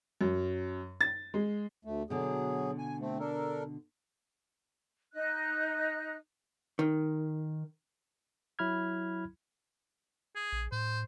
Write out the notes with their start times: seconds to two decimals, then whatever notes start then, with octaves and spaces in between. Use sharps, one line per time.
0.21 F#2
1.01 A6
1.34 G#3
1.85 D2 A3
2.10 B2 D3 F#3 G#4
2.79 G#5
3.00 A3 C4
3.19 D4 A4 A#4
5.14 D#4 D#5 F#6
6.79 D#3
8.59 F#3 E4 B5 F6 G#6
10.36 G#4
10.53 A#1
10.72 A2 C5